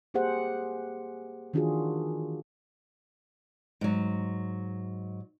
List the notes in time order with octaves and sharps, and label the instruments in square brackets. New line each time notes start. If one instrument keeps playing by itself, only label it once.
[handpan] A#3 G4 G#4 C5 F#5
D#3 E3 D4 F4 F#4 G#4
[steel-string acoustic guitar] G#2 F#3